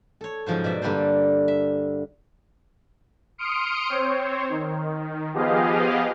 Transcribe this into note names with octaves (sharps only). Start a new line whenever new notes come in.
A4 C#5
G#2 C#3 F3 F#3 C5
B2 D5 E5
G2 D3 G3 A#3 A4 C5
E5
C6 D#6 F6 C#7 D7
C4 C5 C#5
D#3
F3 B3 G4 G#4 D#5 F5